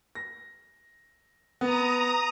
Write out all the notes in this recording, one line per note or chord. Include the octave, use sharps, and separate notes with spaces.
A#6
B3 A#5 D#6